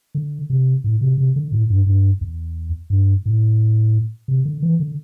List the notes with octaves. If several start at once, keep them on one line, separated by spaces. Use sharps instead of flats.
D3
C3
A2
C3
C3
D3
A2
G2
G2
E2
G2
A2
C3
D3
E3
D3